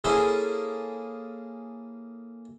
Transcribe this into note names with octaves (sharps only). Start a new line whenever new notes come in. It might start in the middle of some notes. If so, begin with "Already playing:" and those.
A#3 C#4 E4 G#4 A4 C5